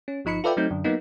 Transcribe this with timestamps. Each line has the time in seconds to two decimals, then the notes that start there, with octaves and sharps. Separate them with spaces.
0.08 C#4
0.25 G1 F3 D#4 B5 C#7
0.44 F4 A4 B4 D5 E5 G5
0.57 F#3 A3 C4 D#4 G6
0.71 F#2 D3
0.84 F#3 A#3 B3 D#4